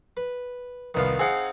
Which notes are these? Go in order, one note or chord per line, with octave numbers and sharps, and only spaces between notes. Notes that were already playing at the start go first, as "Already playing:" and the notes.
B4
C2 D#3 B3 F4 B4
C4 D#4 G#4 F5 F#5